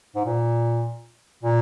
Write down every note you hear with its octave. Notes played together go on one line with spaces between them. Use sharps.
G#2
A#2
A#2